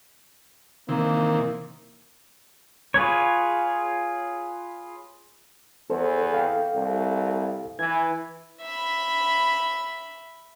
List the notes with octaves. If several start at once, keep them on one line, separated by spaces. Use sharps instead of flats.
C3 D#3 E3 A#3
F4 G#4 B4 C#5
E2 A4 C5
A4 F5 G5
C2
E3 G#6
E5 B5